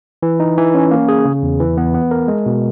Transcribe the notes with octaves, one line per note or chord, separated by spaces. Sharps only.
E3
D#4
E3
C#4
A#3
G#4
C#3
E2
E3
B3
B3
A#4
G#3
B2